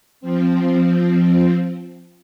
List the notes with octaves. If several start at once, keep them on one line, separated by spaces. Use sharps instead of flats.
F3 C4